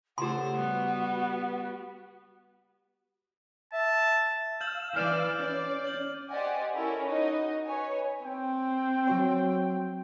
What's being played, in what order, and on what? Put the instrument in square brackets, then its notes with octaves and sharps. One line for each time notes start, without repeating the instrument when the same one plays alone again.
[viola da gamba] C#3 A3 C5 [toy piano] G4 C6 [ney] F#5
[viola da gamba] G3 [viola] B3 F#4
[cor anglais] E5 [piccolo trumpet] A5
[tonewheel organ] F5 E6 [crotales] G6 F#7
[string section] E3 D5 [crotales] F6 C7 D#7
[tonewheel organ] C#4 [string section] D5
[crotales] G6 F#7
[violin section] G4 C5 D5 D#5 F#5 G#5
C#4 E4 A4 A#4 C#5
D#4 F#4 D#5
B4 C#5 G#5
[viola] C4 [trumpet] G5
[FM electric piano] F#3 F#4 C#5